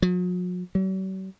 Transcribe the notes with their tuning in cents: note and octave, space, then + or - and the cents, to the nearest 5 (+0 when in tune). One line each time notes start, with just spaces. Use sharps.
F#3 -45
F#3 +45